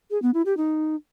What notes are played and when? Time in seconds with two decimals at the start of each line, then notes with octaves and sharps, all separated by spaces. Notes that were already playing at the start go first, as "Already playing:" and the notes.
0.11 G#4
0.22 B3
0.34 E4
0.46 G4
0.57 D#4